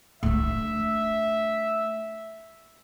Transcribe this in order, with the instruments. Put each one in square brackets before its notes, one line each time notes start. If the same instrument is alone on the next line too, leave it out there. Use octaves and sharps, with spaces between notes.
[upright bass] A3 D4 [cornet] E5